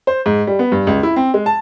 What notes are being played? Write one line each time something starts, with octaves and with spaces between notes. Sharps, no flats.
C5
G#2
G3
B3
G2
C#2
E4
C4
G#3
A5